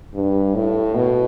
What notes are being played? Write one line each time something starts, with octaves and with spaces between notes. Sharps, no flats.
G2
A2
B2